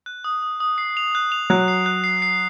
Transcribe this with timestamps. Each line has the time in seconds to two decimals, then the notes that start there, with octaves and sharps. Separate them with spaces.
0.06 F#6
0.24 D#6
0.42 D#6
0.60 D#6
0.78 C7
0.97 F7
1.15 F#6
1.32 F7
1.50 F#3 F#6
1.68 C7
1.86 F#6
2.04 C7
2.22 C7